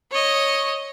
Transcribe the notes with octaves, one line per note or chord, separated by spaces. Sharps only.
C#5 D#5